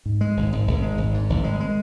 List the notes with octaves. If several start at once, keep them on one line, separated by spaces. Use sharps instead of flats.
G#2
G#3
G#1
G#1
G#1
G#3
G#1
G#2
G#1
G#3
G#3